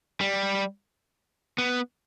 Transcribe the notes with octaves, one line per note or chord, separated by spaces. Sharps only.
G3
B3